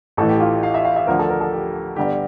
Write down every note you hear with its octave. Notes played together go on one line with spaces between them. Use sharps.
A1 A2 E3 A4
G4
F4
F5
E5
F5
E5
D2 D3 F3 A#4
A4
A#4
A4
G4
G1 G2 D3 G4